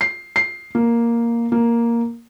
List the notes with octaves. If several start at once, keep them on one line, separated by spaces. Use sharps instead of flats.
C7
C7
A#3
A#3